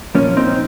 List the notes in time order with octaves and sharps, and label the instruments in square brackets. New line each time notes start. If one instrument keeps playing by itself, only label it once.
[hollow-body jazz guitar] A#2 F3 A#3 C#4
C4 D#4